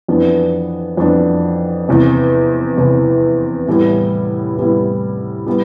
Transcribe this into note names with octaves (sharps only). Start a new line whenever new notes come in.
F2 E3 B3 D4
F2 E3 B3 D4
E2 C3 E3
E2 C3 E3
A2 E3 G3 B3 E4
A2 E3 G3 B3 E4
G3 B3 E4